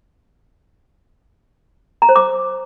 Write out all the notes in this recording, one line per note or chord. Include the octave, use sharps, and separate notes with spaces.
A#5
C5
D6